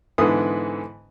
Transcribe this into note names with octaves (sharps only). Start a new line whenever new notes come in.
G#2 D3 E3 B3 D#6